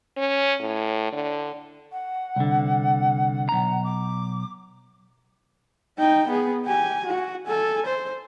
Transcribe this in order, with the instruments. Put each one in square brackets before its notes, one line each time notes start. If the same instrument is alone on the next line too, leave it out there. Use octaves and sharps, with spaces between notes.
[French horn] C#4
A2
D3
[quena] F#5
[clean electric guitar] C2 D3
B1 A#5
[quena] D6
[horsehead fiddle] D#4 G5
B3 G#4
G4 G#5
F#4
A4 G#5
C5